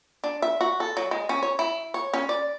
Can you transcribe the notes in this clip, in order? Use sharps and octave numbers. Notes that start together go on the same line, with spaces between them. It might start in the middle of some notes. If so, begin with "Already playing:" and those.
D4
E5
F#4
A4
F#3
G#3
C#4
C#5
E4
C#5
C#4
D5